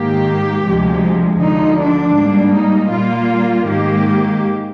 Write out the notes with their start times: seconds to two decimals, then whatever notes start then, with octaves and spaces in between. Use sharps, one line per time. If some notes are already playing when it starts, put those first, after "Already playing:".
Already playing: G#2 D#3 A#3 G4
0.65 D2 C3 F3 G#3
1.40 D2 D3 F3 D#4
1.79 D4
2.16 G#2 G3 A#3
2.54 D#4
2.92 A#2 G3 A#3 F4
3.68 G#2 D#3 A#3 G4